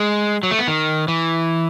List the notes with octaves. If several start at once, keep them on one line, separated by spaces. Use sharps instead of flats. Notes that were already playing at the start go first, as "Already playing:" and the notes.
Already playing: G#3
F#3
A3
B3
D#3
E3